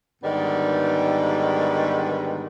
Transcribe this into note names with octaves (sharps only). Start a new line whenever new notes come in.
G#2 D3 D#3 G3 B3